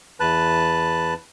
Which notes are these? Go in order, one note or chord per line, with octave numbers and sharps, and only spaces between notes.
E2 B4 A5 F#6